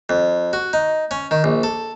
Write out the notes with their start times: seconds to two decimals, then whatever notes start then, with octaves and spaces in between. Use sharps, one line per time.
0.09 F2
0.53 F#4
0.73 D#4
1.11 C#4
1.31 D#3
1.44 A#1
1.63 A4